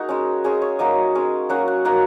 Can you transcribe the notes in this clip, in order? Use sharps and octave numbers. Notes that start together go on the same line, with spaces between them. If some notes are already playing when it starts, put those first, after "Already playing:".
Already playing: A#3 D#4 F#4 G#4
G#3 C#4
G#3 C#4 G#4
C#5
F#3 A#3 D#4 D#5
G#3 C#4
F#3 A#3 C#4 F#5
F#5
F#3 A#3 D#4 F#5